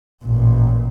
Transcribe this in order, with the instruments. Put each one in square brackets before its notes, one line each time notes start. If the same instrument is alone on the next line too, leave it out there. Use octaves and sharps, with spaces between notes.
[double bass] A1 A#2